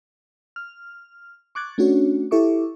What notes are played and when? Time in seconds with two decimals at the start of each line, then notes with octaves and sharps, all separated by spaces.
0.56 F6
1.55 C#6 D6 F#6 G#6 A6
1.78 A3 C#4 D4 F#4 C#5
2.31 E4 G4 A4 E5 C#6 D6